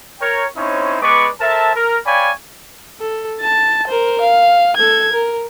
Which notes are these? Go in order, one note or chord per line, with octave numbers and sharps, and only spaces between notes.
A#4 C#5 G5
C4 C#4 D#4 E4 C5 C#5
G#3 B3 B4 D5 C#6 D6
A4 A#4 C5 E5 A5
A#4
C#5 D5 F5 G5 G#5 B5
A4
A5 A6
A#4 C5
F5
A4 G#6
A#4